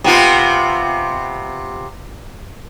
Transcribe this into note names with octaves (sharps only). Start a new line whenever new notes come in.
C3 B3 F4